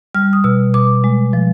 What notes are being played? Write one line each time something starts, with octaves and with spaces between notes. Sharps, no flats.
G3 F6
D#6
B2 E6
B2 D6
G#3
F3